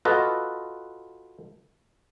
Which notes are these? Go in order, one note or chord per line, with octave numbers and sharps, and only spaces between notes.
F4 F#4 A4 B4 D#5